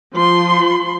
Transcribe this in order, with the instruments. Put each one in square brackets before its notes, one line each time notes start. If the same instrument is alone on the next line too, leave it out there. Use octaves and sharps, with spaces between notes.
[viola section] F3 C6